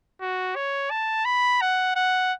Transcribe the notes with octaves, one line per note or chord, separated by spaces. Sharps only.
F#4
C#5
A5
B5
F#5
F#5